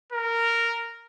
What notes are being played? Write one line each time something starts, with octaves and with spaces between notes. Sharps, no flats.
A#4